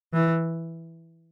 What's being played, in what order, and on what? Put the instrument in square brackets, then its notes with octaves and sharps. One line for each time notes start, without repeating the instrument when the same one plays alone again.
[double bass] E3